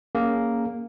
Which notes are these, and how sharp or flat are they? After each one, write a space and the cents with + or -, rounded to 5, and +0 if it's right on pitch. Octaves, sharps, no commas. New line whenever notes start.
A#3 +0 C#4 +5 G#4 +0